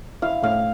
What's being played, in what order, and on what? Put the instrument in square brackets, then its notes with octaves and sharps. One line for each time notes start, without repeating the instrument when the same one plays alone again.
[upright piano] E4 [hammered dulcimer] F5
[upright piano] A2 [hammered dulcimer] F5